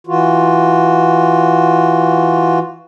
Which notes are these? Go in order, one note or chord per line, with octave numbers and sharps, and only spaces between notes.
E3 F4 F#4